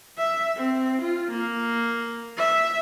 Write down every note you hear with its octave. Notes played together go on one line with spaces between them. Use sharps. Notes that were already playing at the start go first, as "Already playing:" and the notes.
E5
C4
F4
A#3
E5